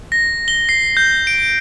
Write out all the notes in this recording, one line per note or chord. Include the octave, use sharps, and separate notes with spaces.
A#6
G7
C7
G6
D7